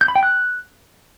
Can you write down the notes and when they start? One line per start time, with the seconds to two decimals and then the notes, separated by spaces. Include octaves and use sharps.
0.01 G6
0.08 B5
0.16 G5
0.23 F#6